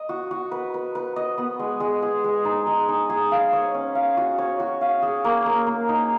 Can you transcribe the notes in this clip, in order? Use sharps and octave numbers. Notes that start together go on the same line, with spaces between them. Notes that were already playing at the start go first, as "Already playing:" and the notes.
Already playing: D#5
F#4
F#4
B4
B4
B4
D#5
B3
G#3
G#3
G#4
G#3
D#4
G#3
D#4
G#4
F5
C#5
C#4
F5
F#4
C#5
F#4
F5
G#4
A#3
A#3
A#3
D#4